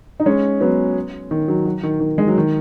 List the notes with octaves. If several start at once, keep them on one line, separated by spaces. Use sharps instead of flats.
D#4
G#3 C#4
F#3 B3
D#3
F#3
F#3
D#3
D#3
G#3
F#3
D#3